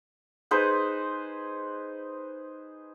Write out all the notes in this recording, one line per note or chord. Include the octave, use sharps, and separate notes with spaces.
D#4 G#4 B4 C5